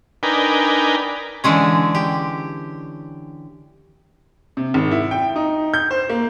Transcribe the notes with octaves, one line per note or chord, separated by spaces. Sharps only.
D4 D#4 A#4 B4 G5 G#5
D3 E3 G#3 C#4
G4
C3
G#1
E4
G5
D#4
G6
C5
A#3